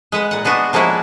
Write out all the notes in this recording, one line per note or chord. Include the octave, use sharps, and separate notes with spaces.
G#3 B4 F#5
A#2 F#5
G#3 B3 D4 F#4
F3 G#3 A#3 C#4 E4 F#4